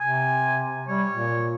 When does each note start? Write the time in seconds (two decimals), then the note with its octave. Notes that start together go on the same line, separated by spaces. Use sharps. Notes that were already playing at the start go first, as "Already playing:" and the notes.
0.01 C3 G#5
0.88 G3 C#5
1.10 A#2